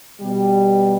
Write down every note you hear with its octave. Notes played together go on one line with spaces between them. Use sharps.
B2 G3